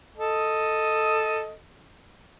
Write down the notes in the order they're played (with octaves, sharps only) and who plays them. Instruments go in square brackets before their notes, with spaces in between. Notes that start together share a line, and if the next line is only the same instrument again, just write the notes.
[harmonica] A4 D#5